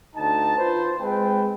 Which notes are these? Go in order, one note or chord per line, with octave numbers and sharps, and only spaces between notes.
D2 D#4 A5
F4 B4 C5
G#3 C4 B4 G5